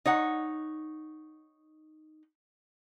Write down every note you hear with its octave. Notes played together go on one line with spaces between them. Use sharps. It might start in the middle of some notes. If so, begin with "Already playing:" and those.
D#4 C#5 F#5